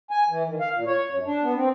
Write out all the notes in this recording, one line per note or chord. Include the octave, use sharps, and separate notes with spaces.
G#5
E3
D#3
F5
A#2
C#5
F#2
D4
B3
C4